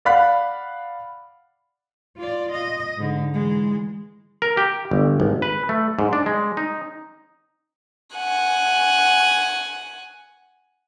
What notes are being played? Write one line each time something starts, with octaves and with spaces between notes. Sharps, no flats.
D5 F5 F#5 B5 F#6 B6
F4 D5
D#5
G#2 D3
E3 G#3
A#4
G4
G1
G#1
B4
A3
G#2
D4
G#3
D#4
F#5 G#5